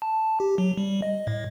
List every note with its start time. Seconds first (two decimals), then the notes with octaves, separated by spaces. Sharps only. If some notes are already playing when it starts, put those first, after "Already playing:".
0.02 A5
0.40 G4
0.58 F#3
0.77 G3
1.02 D#5
1.27 A2